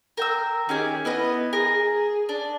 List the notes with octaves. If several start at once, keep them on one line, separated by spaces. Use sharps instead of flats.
A#4 G5 E6
D#3 C#4 G4 G#4
B3 E4 B4 D#5
G#4 A#4
D4